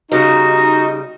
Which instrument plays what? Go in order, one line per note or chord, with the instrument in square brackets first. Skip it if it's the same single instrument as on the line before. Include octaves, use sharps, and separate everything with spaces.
[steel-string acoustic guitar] C#3 G3 [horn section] D#4 [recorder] F#4